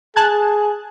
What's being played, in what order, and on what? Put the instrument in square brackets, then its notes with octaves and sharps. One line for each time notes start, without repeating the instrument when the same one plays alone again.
[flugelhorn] G#4 [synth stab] A5 F#6 G#6